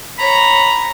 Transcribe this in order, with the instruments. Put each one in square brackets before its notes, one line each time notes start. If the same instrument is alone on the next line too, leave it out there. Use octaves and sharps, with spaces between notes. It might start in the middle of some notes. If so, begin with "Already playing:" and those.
[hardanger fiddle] C#5 A#5 [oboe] B5